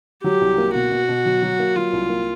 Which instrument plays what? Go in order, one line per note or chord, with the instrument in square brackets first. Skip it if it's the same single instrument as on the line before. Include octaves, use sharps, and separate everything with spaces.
[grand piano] F#3 [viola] G4
[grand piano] C2
A#3
[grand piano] B2 [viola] F#4
[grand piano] B2
B2
F#3
F#3
A#3
[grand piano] F#3 [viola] F4
[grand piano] C2
A#3